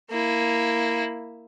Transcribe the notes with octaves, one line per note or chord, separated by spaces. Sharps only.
A#3 E4